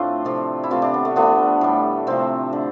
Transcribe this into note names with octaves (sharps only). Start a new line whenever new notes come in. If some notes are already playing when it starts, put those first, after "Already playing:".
Already playing: A2 F3 A3 C4 D4 F4
C3 F3 A3
E4
C3 E3 A3 F4
D4
B3
A3
D3 F3 A3 B3
A2 G3
C3 F3 A3 C4
D3